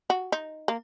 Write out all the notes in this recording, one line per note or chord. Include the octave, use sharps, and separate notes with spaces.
F#4
D#4
A#3